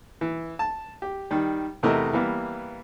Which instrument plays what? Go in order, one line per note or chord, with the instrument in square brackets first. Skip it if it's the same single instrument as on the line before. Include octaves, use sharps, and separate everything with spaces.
[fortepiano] E3
A5
G4
D#3 G3
E2 C3 A3 E4 A#4 D#5
E3 G3 A#3 B3